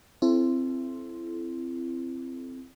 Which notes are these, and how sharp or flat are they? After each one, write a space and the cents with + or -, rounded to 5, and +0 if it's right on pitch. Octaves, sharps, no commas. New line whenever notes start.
C4 +0 E4 +30 A4 -30